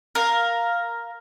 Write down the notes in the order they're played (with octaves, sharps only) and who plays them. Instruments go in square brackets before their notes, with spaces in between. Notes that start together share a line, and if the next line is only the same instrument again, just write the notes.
[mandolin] A#4 F5